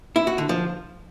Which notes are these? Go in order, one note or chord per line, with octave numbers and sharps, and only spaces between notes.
E4
F#4
D3
F3